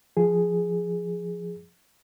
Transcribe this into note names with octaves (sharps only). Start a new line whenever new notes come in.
F3 G#4